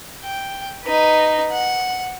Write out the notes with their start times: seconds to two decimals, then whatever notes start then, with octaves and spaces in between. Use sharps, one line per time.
0.24 G5
0.84 D#4 B4
1.52 F#5